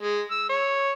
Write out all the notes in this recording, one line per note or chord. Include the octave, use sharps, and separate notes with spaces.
G#3
E6
C#5